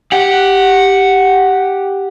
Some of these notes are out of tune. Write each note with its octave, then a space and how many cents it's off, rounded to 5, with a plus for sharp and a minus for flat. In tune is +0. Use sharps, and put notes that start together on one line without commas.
G4 +0 F#5 +0